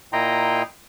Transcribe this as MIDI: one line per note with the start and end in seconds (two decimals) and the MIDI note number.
0.13 0.62 46
0.13 0.62 64
0.13 0.62 75
0.13 0.62 79
0.13 0.62 82
0.13 0.62 84